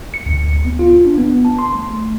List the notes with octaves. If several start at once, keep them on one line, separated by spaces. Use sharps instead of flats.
C#7
D2
B3
F4
D4
B3
A5
C6
A3